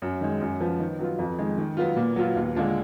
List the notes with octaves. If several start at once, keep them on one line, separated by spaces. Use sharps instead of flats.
F#2
D#3 G#3
F#2
F3 B3
D#3
F#3 B3 F4
F2
D#3 G#3
D#3
F#3 B3 F4
A#2
F#3 B3 F4
D#2
D3 G#3 D4 F4